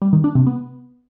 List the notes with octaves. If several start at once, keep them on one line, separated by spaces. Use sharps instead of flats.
G3
D#3
D4
C3
B3